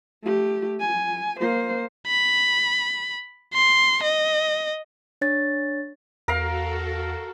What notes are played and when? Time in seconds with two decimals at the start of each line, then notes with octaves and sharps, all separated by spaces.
0.23 A3 G4
0.80 G#5
1.40 A#3 C5
2.07 B5
3.54 C6
4.04 D#5
5.21 D4 C#5 A6
6.28 E2 F#4 A4 A#4 F5